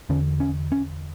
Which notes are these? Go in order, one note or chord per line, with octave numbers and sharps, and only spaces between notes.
E2 D3 C#4
C#4
C#4